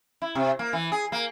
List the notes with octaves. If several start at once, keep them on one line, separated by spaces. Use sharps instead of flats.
E4
C3
A#3
E3
G#4
A#3